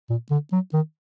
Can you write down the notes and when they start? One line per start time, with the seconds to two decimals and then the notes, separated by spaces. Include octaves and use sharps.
0.10 A#2
0.31 D3
0.52 F#3
0.74 D#3